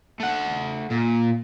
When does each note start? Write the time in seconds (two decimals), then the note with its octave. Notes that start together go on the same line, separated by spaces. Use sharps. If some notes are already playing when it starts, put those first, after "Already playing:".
0.20 A3 F#5
0.91 A#2